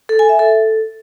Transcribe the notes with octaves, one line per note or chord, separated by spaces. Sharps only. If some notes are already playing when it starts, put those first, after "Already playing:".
A4
G#5
E5
A4